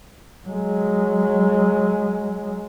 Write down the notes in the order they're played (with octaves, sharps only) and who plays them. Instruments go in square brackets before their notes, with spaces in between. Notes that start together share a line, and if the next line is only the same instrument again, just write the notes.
[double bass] F#3 G#3